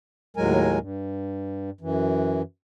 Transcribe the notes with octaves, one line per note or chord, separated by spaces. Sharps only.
D#2 A2 F#3 G#3 A#4 G#5
G2
F#2 E3